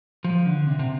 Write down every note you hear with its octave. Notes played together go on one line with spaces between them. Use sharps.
F3
D3
C3
C3